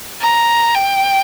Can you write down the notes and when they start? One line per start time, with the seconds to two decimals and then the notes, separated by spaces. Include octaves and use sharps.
0.21 A#5
0.74 G5